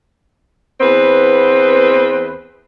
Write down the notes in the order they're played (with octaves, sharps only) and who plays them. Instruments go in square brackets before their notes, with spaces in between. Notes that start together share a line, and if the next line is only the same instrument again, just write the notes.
[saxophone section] E2 B3 C4 B4